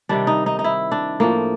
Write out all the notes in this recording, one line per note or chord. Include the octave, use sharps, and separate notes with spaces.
C3 D#3 G3 D4
D#4
D#4
D#4
E4
D4
A2 F3 A#3